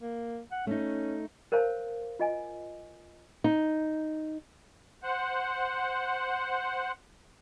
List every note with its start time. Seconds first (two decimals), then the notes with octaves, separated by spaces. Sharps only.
0.01 A#3
0.51 F#5
0.67 A3 C#4 D#4
1.52 A#4 C5 C#5 F5 A5
2.19 F4 D#5 G#5
3.44 D#4
5.03 C5 F#5